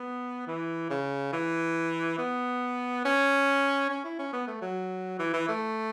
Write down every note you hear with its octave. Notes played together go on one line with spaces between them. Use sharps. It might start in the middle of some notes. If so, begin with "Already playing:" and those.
Already playing: B3
E3
C#3
E3
B3
C#4
C#4
E4
C#4
B3
A3
F#3
E3
E3
A3